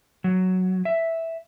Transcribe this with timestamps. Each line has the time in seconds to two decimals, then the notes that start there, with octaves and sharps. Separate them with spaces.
0.24 F#3
0.85 E5